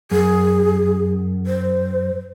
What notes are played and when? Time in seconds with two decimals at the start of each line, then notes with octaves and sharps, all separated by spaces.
0.11 F#2 G#4
1.47 C5